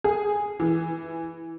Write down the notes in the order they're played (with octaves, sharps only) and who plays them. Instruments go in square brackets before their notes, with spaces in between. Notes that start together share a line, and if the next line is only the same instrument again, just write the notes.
[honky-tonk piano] G#4
E3